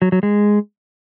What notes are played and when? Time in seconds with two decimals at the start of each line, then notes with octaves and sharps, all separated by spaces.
0.02 F#3
0.12 F#3
0.23 G#3